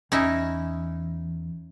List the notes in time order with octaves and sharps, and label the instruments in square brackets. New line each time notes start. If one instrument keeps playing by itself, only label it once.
[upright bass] E2 [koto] C#4 D#4 E4